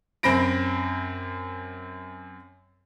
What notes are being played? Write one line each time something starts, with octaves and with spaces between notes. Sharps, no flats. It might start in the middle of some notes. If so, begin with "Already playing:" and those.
F#2 C4 B5 A#6 D7